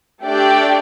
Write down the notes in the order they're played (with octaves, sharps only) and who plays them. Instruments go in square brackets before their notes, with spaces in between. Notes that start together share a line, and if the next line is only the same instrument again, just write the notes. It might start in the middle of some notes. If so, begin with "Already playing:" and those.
[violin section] A3 D4 G4 D5 G5